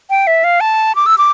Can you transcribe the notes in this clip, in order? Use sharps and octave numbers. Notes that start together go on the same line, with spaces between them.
G5
E5
F5
A5
D6
E6
D6